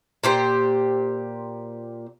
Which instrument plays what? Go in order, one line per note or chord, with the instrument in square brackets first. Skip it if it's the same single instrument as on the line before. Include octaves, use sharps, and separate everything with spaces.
[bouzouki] A#2 G4 C5